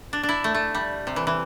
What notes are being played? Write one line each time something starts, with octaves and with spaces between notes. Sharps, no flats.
D4
D4
E4
A3
A3
G3
C3
E3
E3